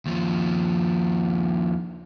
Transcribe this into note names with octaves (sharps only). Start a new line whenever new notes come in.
D#2 F3